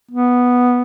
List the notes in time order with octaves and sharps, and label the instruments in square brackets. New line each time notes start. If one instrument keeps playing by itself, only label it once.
[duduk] B3